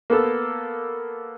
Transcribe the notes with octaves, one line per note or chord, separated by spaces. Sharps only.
A#3 B3 A4